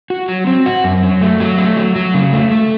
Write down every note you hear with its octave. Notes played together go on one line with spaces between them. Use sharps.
F#4
F#3
C4
F#4
F#2
F#3
A3
F#3
A3
F#3
F#3
C#3
A3
A3